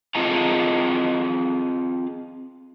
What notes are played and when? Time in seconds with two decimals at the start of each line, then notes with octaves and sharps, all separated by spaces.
0.15 C4 F4 G#4 D#5 A5 A#5